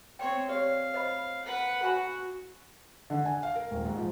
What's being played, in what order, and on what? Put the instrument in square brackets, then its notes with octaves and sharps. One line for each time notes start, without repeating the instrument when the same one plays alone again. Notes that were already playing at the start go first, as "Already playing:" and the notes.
[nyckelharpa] C4 C#5 [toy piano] G5 C6
[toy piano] G4 C#5 D5 [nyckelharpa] F5
[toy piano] C5 D#5 B5
[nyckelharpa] B4 F#5
[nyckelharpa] F#4 [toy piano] F#5 G#5 B5
[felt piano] D3
G#5
F5
A#4
D#1
G#2
F3